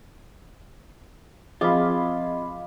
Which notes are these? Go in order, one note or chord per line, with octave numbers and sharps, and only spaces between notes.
F3 C4 F4 G#4 D#5 F5 B5 D6